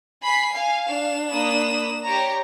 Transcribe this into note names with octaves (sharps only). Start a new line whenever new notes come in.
G#5 B5 B6 C7
F5 G#5
D4 E7
A#3 B5 D#6
G4 C#5 A#5